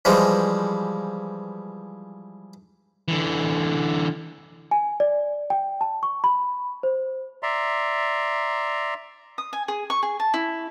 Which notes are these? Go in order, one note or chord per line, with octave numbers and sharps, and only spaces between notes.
E3 F3 G3 G#3
D3 E3
G#5
D5
G5
A5
C#6
B5
C5
D5 E5 A#5 C6
D#6
G#5
G#4
C#6
G#4
A5
E4